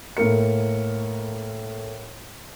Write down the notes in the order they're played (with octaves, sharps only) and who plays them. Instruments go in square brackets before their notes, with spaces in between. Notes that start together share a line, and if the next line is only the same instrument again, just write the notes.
[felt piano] A2 A#3 A#4 C#7